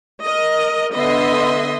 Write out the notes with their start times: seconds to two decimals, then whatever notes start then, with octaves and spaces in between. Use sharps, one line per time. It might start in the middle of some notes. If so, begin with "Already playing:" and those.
0.22 A#4 D#5
0.93 D3 B3 D#5 E5 C6